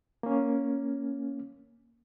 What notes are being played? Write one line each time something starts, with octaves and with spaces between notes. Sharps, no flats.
A#3 C#4